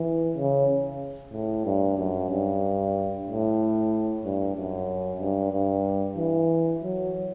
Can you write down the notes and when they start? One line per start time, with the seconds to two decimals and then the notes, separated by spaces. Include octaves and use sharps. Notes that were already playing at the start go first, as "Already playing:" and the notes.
Already playing: E3
0.37 C#3
1.33 A2
1.66 G2
1.98 F#2
2.30 G2
3.28 A2
4.25 G2
4.57 F#2
5.21 G2
5.53 G2
6.17 E3
6.83 F#3